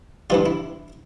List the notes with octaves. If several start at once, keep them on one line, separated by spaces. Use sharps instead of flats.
G2 E3 G3 F4
E4